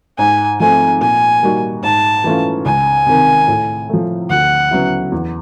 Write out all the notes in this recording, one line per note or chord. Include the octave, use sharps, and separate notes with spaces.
G#2 G#5
F3 A3 C4 G#5
A#2 G#5
G3 A#3 D#4 F#4
G#2 A5
E3 A3 C#4 F4
C#2 G#5
C3 D#3
A2
F3 A3
D2 F#5
C#3 F#3 B3 E4
E2